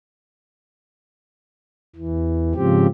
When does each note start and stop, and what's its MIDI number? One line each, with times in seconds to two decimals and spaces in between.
1.96 2.53 40
1.96 2.53 52
2.55 2.87 44
2.55 2.87 49
2.55 2.87 53
2.55 2.87 60
2.55 2.87 67